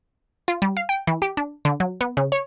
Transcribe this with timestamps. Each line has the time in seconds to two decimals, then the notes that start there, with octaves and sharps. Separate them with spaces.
0.48 F4
0.62 G3
0.77 F5
0.89 G5
1.07 E3
1.22 G4
1.37 D4
1.65 D3
1.80 F#3
2.01 B3
2.17 C#3
2.32 C#5